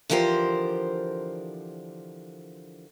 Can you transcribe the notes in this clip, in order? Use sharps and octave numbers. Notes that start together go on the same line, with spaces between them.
D3 E3 F3 G4 A#4 C5